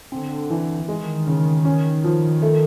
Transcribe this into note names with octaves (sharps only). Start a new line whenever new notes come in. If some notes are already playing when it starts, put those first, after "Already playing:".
D3 C4
E3
D#3 G#3
C#3
C#4
F3
A3